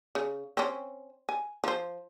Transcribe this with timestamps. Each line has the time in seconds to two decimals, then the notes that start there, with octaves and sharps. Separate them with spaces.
0.15 C#3
0.57 C4 C#4
1.29 G#5
1.64 F3 C5